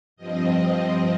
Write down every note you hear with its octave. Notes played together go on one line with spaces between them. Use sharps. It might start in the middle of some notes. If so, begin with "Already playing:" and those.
G2 F3 C4 D#5